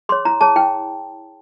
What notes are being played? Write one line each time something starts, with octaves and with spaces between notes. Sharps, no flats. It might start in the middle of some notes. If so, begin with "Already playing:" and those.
G#4 C#5 C6
E4 A#5
G#4 C#5 A5
E4 G5